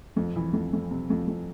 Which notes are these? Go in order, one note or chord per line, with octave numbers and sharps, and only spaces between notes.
F2
E3
F2
F2
C3
F2
F2